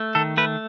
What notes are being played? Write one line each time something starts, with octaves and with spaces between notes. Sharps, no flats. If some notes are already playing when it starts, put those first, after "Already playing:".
Already playing: A3
D#3 A4
A3 B4